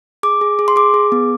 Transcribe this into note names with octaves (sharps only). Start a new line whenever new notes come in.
G#4 D6
G#4
G#4
C6
G#4 D6
G#4
B3